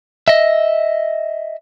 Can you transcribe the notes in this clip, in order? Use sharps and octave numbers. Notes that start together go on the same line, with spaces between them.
D#5 E5